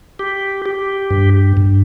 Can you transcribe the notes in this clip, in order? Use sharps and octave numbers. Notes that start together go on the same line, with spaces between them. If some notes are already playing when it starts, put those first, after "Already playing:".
G4
G4
G2
G2